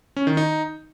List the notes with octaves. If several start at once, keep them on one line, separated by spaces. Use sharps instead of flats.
C#4
D#3
D#4